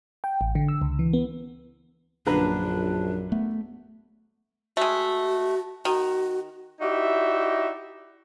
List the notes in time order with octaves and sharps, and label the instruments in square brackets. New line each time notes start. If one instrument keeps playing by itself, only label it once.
[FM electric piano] G5
A1
D3
E6
C#2
E3
B3
[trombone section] A#1 F#2 [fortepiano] D3 B4 A#5 [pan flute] D4
[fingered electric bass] A3 B3
[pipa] G#3 A3 [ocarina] F#4
[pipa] D#3 [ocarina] F#4
[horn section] D#4 E4 F#4 G4 D5 E5